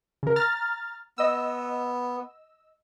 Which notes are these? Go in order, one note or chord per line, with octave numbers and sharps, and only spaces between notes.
C#3 A#4
A#5 F6 A6
B3 D#5 E6